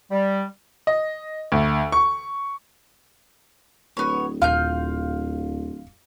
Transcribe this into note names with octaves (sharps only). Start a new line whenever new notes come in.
G3
D#5
D2
C#6
D1 B3 C#5
D#1 F4 F5 F6 G6